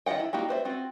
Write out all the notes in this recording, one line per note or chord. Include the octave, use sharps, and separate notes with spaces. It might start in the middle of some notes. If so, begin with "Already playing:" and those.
D#3 F4 D#5 F#5 G5
E4
A#3 D#4 F#4 G4
B4 C5 D5 E5
C4 F4 F#4